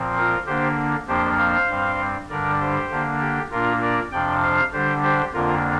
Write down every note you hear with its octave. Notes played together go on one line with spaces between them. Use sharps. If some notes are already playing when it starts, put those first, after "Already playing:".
Already playing: A#2 F3 C4
F4 A#4
D3 A#3 D4 G4 C5
F2 F3 A#3 D4 G4 C5
C5 F5
G2 G3 C4
G2 D3 G3 D4 A#4 D5
G4 C5
D3 A#3 D4
G4
A#2 A#3 D4 F4 A#4
A#4 D5
F2 C3 F3 D4 D5 G5
C5 F5
D3 G3 D4 G4 C5
G4 C5
F2 D3 A#3 D4 F4 A#4